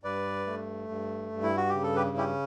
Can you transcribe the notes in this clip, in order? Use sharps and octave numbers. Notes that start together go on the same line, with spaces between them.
G2 B4 D5
A3
G2
G2
E4
F#4
G4
C#3
A4
G4 B4
C#4 E4 G4